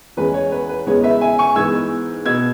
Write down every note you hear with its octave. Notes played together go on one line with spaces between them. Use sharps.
E2 E3 G#3 C#4 B4
C#5
B4
B4
E2 C#3 G#3 B3 C#5
B4 E5
E5 G#5
G#5 C#6
G#2 E3 G#3 B3 E6 G#6
B2 B3 E6 G#6